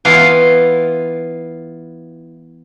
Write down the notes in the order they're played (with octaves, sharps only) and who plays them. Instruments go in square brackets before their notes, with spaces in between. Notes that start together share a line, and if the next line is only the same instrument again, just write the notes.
[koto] E3 B3 E4 F4 F5